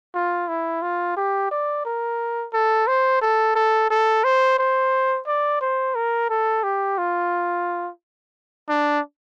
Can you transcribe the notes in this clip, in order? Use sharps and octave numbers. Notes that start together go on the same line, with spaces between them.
F4
E4
F4
G4
D5
A#4
A4
C5
A4
A4
A4
C5
C5
D5
C5
A#4
A4
G4
F4
D4